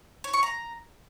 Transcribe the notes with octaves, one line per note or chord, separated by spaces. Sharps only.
C#5
C#6
A#5